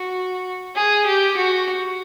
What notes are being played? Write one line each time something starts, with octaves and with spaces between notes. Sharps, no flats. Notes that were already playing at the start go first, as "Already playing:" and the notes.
Already playing: F#4
G#4
G4
F#4